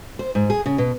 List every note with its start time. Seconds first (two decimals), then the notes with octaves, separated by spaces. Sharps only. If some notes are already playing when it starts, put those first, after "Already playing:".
0.19 C5
0.35 G#2
0.50 G#4
0.66 C#3
0.78 B2